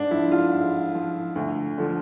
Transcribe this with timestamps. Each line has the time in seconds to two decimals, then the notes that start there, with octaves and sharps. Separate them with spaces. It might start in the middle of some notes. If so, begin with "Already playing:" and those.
Already playing: G#2 D4
0.11 F3 E4
0.32 F4
0.53 G#2
0.95 F3
1.35 D2
1.78 D3 F3